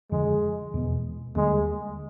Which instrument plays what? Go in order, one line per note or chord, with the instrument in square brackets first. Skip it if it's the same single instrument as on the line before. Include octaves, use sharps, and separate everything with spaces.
[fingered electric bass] F2 D3 F3 [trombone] G#3
[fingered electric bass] E2 B2 G#3 B3
[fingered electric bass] D#2 D3 G3 A#3 [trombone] G#3